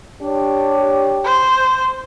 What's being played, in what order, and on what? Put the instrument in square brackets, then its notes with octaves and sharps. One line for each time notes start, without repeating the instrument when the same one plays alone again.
[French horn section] D4 G4 C#5
[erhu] C5